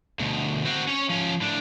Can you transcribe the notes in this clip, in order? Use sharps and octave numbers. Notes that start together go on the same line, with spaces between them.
D2 B2
C4 F#4
C#4 C#5
F3 C#4
A2 D4